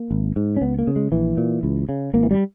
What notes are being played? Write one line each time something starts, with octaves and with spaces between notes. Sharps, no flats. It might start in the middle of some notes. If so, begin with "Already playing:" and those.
Already playing: A#3
G#1
G#2
C#4
C#2 B3
A#3
C#3
G#3
A#1 E3
A#2
C#2
C#3
G#1 A#3
E3
G3